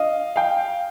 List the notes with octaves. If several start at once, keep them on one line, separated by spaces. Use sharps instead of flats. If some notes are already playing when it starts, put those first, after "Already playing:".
Already playing: D#5 F5
F5 G5